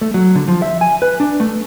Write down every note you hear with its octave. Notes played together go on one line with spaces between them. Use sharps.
A3
F#3
D3
F3
E5
G#5
B4
D4
A3